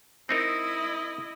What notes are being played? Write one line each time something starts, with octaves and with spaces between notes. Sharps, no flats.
C4 D#4 E4 A#4 D#5